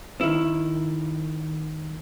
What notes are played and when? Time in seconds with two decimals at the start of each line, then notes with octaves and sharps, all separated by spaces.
0.21 D#3 E4